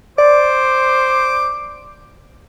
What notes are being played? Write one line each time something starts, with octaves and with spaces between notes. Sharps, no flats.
C5 D5 D6